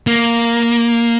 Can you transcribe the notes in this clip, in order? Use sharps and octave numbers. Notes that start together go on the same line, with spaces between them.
A#3